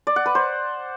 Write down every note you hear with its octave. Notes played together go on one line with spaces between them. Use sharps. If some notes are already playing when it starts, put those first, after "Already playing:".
D5
F#5
B4
C5